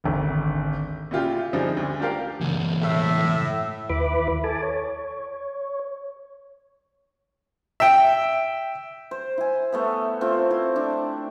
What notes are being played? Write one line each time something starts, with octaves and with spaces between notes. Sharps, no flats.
D#1 G#1 D2
A#2 C#3 E4 F4 G4
D3 F3 G3 G#3 C4 D#4
D2
D4 F4 G4 A#4 F5
C#2 E3
A2 E5
D#2 E4 B4 B5 D6
A4 G#5 A5 D6
C#5
E5 G5
C5
E4 G#5
A3 B3 E5
A3 C4 F4
E4
D4